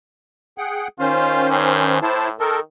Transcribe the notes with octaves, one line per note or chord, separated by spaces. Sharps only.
G#4 F#5 G5
D#3 C#4 F4 C5
G2
A2 E4 C5 A5
D#3 A4 A#4